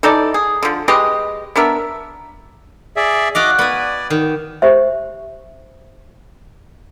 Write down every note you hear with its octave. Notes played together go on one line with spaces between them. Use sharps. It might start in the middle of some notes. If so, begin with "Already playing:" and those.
E3 D#4 A4 D5
G#4
D3 F3
G#3 G4 B4 D#5
B3 D4 A#4 E5
G#4 D5 E5
F#4 D5 D#5 F5 D6
B3 D5 G#5
D#3
G4 C5 E5